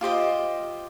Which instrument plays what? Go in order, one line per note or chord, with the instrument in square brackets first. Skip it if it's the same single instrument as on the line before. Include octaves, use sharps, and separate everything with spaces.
[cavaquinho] F4 G4 C5 D#5